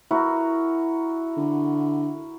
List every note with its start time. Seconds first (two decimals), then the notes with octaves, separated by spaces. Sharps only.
0.11 E4 F#4 A#4
1.37 D3